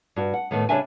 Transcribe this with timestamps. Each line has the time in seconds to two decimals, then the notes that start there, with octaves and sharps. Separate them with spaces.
0.16 G2 F#4
0.33 F#5
0.51 A2 D#3 A3 B3
0.69 C#3 E3 G3 D4 E5 G#5